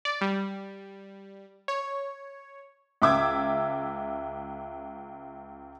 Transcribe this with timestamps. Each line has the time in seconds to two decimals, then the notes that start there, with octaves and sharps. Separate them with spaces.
0.05 D5
0.21 G3
1.68 C#5
3.02 C#2 E5 D6 E6 G#6